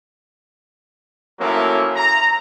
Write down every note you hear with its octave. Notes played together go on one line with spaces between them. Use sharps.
F3 F#3 A3 A#3 C#4 E4
A#5